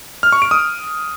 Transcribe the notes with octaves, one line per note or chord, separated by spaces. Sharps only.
F6
C#6
D7
D#6